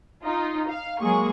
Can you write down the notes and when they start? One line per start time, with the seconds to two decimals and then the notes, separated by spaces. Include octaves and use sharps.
0.23 D#4 F4
0.69 F5
1.01 F#3 G#3 A#3 G#4 C#6